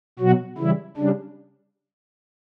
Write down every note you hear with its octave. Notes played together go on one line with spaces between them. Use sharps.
B2 F#3 F#4
C#3 E3 G3 E4
C#3 G3 D4